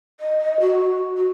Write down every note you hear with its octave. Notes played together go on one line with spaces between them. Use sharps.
D#5
F#4
F#4